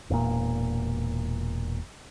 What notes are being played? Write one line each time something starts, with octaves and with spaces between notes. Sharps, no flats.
E1 A#2